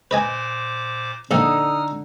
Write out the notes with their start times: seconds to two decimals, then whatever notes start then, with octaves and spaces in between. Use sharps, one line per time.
0.11 A#2 B4 C5 D#5 G#5 D6
1.31 A#1 A#2 D3 D#3 D#4 A4 D#6 F6